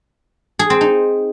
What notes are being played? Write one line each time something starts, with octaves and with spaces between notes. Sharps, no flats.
G#4
C4
D#4